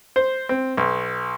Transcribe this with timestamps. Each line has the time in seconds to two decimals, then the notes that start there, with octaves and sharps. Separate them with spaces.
0.16 C5
0.49 C4
0.77 B1